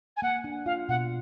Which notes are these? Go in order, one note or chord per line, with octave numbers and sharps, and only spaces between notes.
G#5
A#3 F#5
D4
F4 F5
B2 F#5